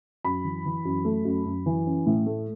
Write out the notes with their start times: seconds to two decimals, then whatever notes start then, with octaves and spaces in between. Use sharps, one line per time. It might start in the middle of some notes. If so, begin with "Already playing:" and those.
0.24 F#2 B5
0.44 E3
0.65 E3
0.85 F#2
1.05 A3
1.25 F#2
1.45 F#2
1.66 E3
1.86 C#4
2.06 A2
2.26 A3